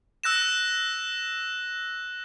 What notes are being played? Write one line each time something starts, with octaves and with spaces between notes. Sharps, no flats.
E6 F#6 A#6 E7